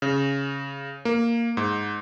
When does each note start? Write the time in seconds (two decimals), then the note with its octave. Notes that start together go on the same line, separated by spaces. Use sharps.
0.02 C#3
1.05 A#3
1.57 G#2